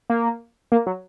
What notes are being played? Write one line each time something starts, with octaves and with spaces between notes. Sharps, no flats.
A#3
A#3
F#3